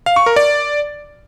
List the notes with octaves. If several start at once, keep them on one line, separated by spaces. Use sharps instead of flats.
F5
C#6
A#4
D5